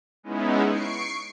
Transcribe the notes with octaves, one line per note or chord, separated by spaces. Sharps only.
G#3 B3 C#4 D#4 E4
C#6 C7 D7